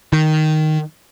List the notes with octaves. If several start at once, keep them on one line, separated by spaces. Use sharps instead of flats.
D#3